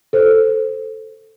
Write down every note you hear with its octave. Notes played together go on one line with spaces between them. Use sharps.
A4 C5